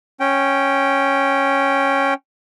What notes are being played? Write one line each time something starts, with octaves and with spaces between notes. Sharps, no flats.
C#4 G5